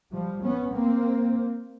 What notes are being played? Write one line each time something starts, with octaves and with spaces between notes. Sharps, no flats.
F3 G3
B3 C#4
A#3 C4